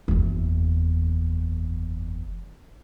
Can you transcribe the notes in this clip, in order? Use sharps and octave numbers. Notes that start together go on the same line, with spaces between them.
F#1 E2